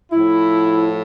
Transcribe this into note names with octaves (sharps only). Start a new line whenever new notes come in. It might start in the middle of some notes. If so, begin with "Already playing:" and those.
A2 F3 E4